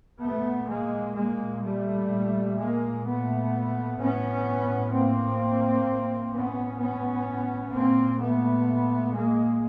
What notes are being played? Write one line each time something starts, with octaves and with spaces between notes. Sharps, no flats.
A#2 A3 B3
G#3 A#3
G#3 A#3
G3 A3
A#2
G#3 A#3
A3 B3
A2 B3 C#4
A#3 C4
A2
B3 C#4
B3 C#4
A#2 A#3 C4
A3 B3
G#3 A#3